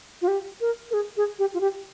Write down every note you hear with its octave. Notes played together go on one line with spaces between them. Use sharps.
F4
G4
A#4
A#4
G#4
G#4
G4
F4
G4